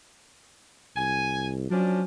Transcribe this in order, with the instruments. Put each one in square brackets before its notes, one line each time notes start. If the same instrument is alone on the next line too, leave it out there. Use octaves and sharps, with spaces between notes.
[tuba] C2 [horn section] G#5
[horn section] F3 C#4 D4 [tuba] F#3